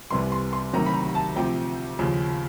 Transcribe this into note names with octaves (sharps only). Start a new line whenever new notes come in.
C2 C3 E3 G3 C6
C6
C6
D2 C3 D#3 F#3 A#5
B5
A#5
A5
D2 C3 F3 G5
D#2 C#3 F3